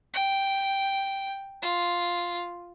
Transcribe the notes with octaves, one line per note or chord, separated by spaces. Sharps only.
G5
F4